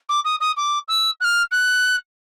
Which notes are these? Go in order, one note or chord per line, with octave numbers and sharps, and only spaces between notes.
D6
D#6
D#6
D6
E6
F#6
F6
F#6